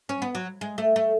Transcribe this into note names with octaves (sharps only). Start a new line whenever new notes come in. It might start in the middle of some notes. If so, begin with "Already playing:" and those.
C#4
B3
F#3
G#3
A3
A3